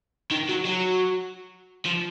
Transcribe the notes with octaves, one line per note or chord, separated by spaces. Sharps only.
D#3
F#3
F#3
F3